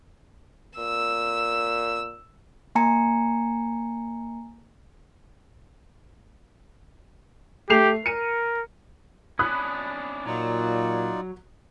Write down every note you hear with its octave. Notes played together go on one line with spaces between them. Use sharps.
A#2 E6
A#3 G#5 A#5 C#7
A3 G4 C7 F7
A#4 C#7 D#7
C#4 D4 B5 D#6 F#6
A#2 F#3 D#4 F4 D5